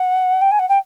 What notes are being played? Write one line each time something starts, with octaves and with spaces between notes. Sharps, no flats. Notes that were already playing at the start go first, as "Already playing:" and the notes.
Already playing: F#5
G5
G#5
F#5
G5